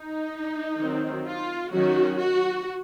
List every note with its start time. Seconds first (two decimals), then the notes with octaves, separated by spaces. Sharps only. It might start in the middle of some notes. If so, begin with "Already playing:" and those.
Already playing: D#4
0.81 D#3 F#3 C4
1.27 F4
1.73 D#3 F#3 C#4 F#4
2.18 F#4